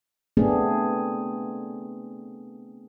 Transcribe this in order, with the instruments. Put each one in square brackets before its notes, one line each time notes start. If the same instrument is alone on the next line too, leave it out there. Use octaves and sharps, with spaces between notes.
[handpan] A3 B3 C4 D4 G#4